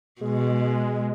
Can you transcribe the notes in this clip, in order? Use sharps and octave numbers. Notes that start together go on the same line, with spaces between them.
B2 G#3